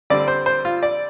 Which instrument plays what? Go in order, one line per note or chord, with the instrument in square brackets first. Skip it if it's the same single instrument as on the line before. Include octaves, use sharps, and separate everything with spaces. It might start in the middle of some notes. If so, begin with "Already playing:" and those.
[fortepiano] D3 G3 C4 D5
C5
C5
F4
D5